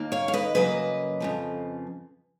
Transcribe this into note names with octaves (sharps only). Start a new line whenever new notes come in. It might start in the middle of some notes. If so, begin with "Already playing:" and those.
Already playing: D#2 D#3 A#3
C#5 F5
F5
B4 D#5
F#2 C#3 F#3 A#3 B4 D#5
F2 C#3 F3